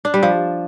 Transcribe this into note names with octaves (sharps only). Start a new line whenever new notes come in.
D4
G3
F3